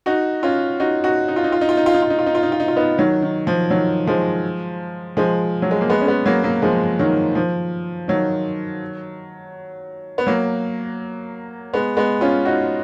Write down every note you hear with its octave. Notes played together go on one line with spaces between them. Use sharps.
D#4 F#4
C#4 F4
D#4 F#4
D#4 F#4
D#4
F4
D#4
F4
D#4
F4
D#4
F4
D#4
F4
D#4
F4
D#4
F4
D#4
F4
D#4
F4
B3 D#4
D#3 F#3
D#3
F3
D#3 F#3
F3 G#3
F3 G#3
F#3
G#3
A#3
G#3 B3
C#4
G#3 B3
F#3 A#3
F#3 A#3
F3 G#3
D#3 F#3
F3
D#3 F#3
B3
F#3 A#3
G#3 B3
G#3 B3
C#4 F4
D#4 F#4